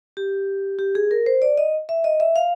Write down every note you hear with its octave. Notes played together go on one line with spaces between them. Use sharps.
G4
G4
G#4
A#4
C5
D5
D#5
E5
D#5
E5
F5